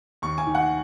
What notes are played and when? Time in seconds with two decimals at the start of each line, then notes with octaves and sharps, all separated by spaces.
0.22 D#2 C#6
0.38 G#5
0.46 D#3
0.55 F#5